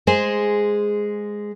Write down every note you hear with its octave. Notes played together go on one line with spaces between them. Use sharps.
G#3 G#4 C5